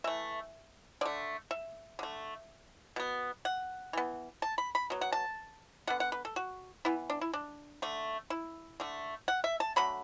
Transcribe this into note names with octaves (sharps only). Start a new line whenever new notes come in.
E3 A3 E5
D3 A3 D5
E5
D3 A3
B2 B3
F#5
E3 B3
A5
B5
B5
B2 F#3
F#5
A5
D3 B3 F#5
F#5
B4
A4
F#4
E3 B3 E4
D4
E4
D4
D3 A3
E4
D3 A3
F#5
E5
A5
D3 F#3 A3 B5